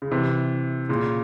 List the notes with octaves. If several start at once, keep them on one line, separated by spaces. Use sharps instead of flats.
C#3
C3 E3
A#2 C#3